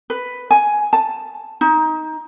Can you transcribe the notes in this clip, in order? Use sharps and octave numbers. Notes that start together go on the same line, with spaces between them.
B4
G#5
A5
D#4